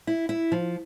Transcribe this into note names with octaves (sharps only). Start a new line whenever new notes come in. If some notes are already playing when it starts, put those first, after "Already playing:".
E4
E4
F3